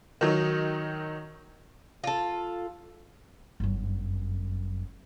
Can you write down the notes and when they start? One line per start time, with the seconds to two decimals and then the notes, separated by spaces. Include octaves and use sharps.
0.21 D#3 F#3 D#4
2.04 F4 A4
3.60 G1 F#2